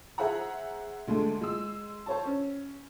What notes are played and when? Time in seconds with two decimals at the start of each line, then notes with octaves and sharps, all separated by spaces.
0.18 G#4 C5 E5 F#5 A#5
1.07 D2 G#3 A3 D4
1.41 G#3 E6
2.06 C5 C#5 A5
2.26 C#4